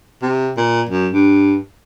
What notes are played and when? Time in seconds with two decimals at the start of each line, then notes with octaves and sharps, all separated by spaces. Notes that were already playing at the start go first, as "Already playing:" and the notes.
0.22 C3
0.57 A#2
0.89 F#2
1.13 G2